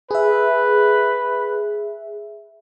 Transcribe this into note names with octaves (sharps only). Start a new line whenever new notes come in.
G#4 B4 E5